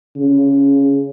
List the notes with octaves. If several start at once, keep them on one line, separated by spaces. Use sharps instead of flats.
C#3